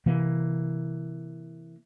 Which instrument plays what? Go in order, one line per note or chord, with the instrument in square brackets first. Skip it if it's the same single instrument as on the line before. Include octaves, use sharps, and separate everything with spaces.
[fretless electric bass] C3 E3 A#3